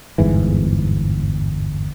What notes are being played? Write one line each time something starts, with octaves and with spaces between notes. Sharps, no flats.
G1 E2 G#2 E3